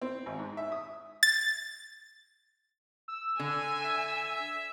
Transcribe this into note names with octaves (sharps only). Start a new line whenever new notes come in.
C4
G#1
G#2
E5
D#6
A6
E6
D3 G#5
E5